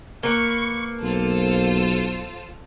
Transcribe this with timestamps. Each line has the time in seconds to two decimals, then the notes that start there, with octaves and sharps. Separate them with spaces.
0.23 A#3 B4 C#6
1.02 B1 F4 A4 C5